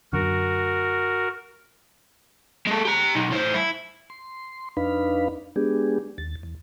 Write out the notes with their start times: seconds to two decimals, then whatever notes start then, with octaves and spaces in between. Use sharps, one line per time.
0.13 F#2 D3 F#4 A#4
2.67 G#3 A4
2.85 G4 A#5
3.16 B1 D#4
3.32 A2 C5
3.55 E4
4.10 C6
4.77 F2 D4 D#4 B4 F5 B5
5.56 G#3 B3 D4 G4 G#4
6.18 D#2 A6
6.43 E2